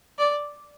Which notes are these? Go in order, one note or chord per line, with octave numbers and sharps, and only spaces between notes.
D5